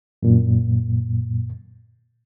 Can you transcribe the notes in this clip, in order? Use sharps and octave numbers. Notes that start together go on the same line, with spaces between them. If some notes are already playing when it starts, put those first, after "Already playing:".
F#2 A#2